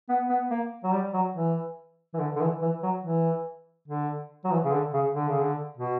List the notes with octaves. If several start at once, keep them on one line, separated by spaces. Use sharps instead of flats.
B3
B3
A#3
F#3
G3
F#3
E3
E3
D3
D3
E3
E3
F#3
E3
D3
F#3
E3
C#3
D3
C#3
D3
C#3
D3
B2